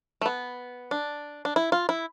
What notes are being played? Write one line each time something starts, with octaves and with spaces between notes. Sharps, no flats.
A3
B3
D4
D4
E4
F4
E4